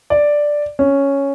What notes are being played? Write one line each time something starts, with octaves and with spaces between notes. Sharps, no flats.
D5
C#4